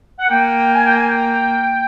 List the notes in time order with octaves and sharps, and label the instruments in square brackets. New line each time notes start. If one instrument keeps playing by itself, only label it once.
[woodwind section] F#5
[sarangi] A#3 [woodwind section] G5
[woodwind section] G#5
G5
G#5
G5